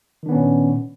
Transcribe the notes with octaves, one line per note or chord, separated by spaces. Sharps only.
A#2 D#3 B3 C#4 D4